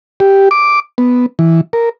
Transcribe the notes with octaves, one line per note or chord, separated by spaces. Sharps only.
G4
D6
B3
E3
A#4